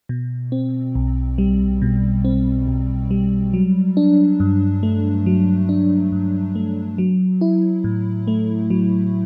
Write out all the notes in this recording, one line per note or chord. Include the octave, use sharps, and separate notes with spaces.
B2
C4
B1
G3
B2
C4
B1
G3
F#3
D4
G2
A3
F#3
D4
G2
A3
F#3
E4
A2
A3
F#3